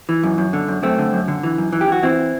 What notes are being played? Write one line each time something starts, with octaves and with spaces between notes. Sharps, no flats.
E3
F#2
F#2
D3
F#2
F#2 A3 C4
D3
F#2
D3
E3
F#2
E3
G4
E3 F#4
E3 C4 E4